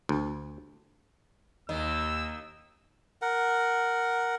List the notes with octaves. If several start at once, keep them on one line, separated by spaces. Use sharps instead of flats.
D2
D#2 D#3 D#5 E6
A#4 F#5